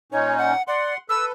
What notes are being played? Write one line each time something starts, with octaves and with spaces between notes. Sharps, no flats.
A#2 C#4 D#4 C#5
F#5
D5 F#5 C6
A4 B4 E6